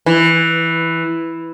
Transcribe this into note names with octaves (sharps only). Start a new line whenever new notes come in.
E3